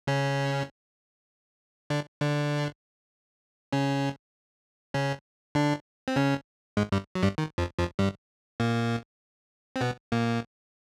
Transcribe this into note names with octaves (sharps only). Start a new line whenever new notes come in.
C#3 C#4
D3 D4
D3 D4
C#3 C#4
C#3 C#4
D3 D4
C4
C#3 C#4
G#2 G#3
G2 G3
F#3
G2 G3
D#3
F2 F3
F2 F3
G2 G3
A#2 A#3
C4
B2 B3
A#2 A#3